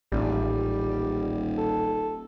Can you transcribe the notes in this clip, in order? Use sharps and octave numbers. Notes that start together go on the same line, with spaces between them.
D#1 A1 G3
A4